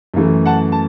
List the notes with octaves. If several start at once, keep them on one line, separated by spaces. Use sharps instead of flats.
F#2 E3 A3
F#5 A5
A5